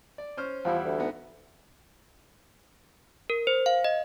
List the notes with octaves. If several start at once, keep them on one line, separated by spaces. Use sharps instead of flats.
D5
C#4 C5 F6
E2 F3 G3 E4
D2
G#2 B3
A#4
C5
F5
D#5